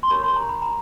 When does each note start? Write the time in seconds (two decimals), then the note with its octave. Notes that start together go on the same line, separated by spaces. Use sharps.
0.03 C6
0.10 D#4 G4 A#4 C#5 B5
0.23 C6
0.36 A#5
0.49 B5
0.62 A#5